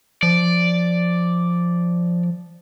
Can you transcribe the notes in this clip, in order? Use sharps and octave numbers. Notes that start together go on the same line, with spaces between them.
F3 D5